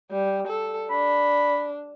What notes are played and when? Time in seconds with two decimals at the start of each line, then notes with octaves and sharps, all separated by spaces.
0.11 G3
0.47 A4
0.90 D4 B5